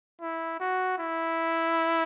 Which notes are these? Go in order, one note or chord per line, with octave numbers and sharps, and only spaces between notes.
E4
F#4
E4